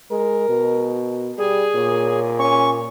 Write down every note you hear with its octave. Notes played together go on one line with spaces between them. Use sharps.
G#3 A#4
B2
G3 G#4
A#2 C#5
C#4 C#6